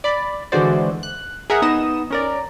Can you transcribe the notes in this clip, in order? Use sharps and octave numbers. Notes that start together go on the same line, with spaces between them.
D5 B5
D3 E3 G#3 F#4 C5 D5
F#6
G#4 A#4 E5 F#5
B3 D#4 D#5 D#6 E7
C#4 A#4 D5